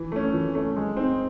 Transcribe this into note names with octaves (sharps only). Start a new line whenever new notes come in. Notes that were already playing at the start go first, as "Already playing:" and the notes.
Already playing: E3
A3 C#4
E3
A3 C#4
G#3
C4 D#4